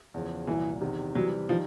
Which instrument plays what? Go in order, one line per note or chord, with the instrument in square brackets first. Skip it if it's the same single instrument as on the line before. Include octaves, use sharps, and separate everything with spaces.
[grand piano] E2 C#3 F3
[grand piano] C2 A#2 F#3 [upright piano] E3
[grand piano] E2 C3 D#3
[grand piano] C3 E3 G3 [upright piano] F#3
[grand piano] D#3 G3 [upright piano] F3